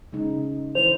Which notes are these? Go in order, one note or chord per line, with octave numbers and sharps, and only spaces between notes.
C#3 G#3 D#4
E3 E4 A4 C5 F7